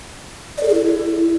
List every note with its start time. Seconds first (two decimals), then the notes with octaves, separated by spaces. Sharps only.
0.58 D5
0.63 A4
0.68 G#4
0.74 E4